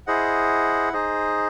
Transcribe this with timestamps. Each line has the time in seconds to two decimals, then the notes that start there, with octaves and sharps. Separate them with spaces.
0.07 E4 G#4 C5 D#5 F#5
0.93 D#4 G#4 C5 D#5